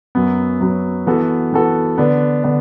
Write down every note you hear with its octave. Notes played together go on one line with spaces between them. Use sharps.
F#2 F#3 B3
F#2 F#3 B3
E3 B3 F#4 A4
E3 B3 F#4 A4
D3 B3 D4 B4
D3 B3 D4 B4